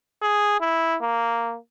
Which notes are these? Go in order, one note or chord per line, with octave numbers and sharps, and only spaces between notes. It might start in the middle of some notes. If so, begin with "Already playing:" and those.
G#4
E4
A#3